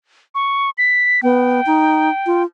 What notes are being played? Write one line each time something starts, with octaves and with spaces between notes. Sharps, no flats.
C#6
B6
B3 G5
D#4
F4